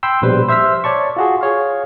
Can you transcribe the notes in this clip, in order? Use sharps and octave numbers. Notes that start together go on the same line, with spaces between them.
G5 B5 C6 E6
A#1 B2 G3 B4 C5
C5 E5 E6 F6 B6
C#5 D5 A5 C#6
F4 F#4 G#4
G#4 C#5 F5